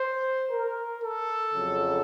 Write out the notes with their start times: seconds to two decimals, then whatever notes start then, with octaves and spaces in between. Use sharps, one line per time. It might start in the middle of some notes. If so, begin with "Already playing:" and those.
Already playing: C5
0.51 A#4
1.02 A4
1.54 F2 C#3 F#3